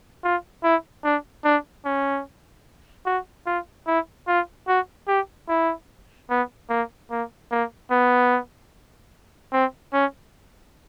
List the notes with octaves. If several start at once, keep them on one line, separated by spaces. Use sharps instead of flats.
F4
E4
D4
D4
C#4
F#4
F4
E4
F4
F#4
G4
E4
B3
A#3
A#3
A#3
B3
C4
C#4